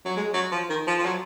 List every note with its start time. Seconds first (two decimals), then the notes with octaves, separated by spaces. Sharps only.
0.05 F#3
0.17 G#3
0.34 F#3
0.52 F3
0.70 D#3
0.87 F3
0.99 F3
1.05 F#3